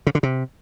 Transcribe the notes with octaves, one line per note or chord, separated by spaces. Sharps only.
C#3
D3
C3